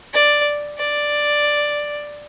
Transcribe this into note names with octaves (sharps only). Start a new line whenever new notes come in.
D5
D5